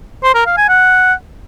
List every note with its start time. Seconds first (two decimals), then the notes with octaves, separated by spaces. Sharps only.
0.24 C5
0.35 A#4
0.46 F5
0.57 G#5
0.69 F#5